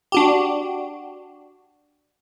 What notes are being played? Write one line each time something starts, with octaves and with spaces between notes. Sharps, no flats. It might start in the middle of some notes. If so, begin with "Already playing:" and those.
D4 F#4 G4